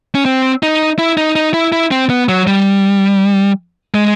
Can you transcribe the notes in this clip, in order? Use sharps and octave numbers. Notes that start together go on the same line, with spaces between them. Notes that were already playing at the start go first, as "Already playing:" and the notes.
C#4
C4
D#4
E4
D#4
D#4
E4
E4
C4
B3
F#3
G3
G#3